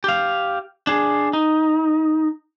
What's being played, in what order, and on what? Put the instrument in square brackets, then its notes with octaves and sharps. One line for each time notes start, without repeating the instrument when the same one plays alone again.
[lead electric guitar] G4 F5
D4 G#4
D#4